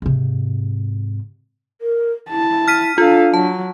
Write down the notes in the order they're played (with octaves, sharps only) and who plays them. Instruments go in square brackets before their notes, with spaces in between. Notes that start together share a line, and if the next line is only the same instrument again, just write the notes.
[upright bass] G#2 C3
[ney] A#4
[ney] E4 [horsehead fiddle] A5
[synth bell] F6 B6 D#7
[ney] D4 [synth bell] F4 [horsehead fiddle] A4 F5
[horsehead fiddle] F#3 [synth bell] A5